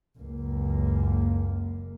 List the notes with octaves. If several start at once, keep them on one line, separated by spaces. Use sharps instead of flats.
F#1 C#2 A#3